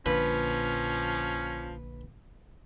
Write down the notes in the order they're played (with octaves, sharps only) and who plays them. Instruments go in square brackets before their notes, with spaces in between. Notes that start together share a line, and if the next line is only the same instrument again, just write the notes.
[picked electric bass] A#1 A#2 D3 [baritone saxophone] F3 [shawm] C#4 [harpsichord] B4